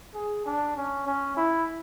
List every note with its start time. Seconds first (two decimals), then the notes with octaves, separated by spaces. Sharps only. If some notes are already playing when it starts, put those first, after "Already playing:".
0.14 G#4
0.46 D4
0.77 C#4
1.07 C#4
1.37 E4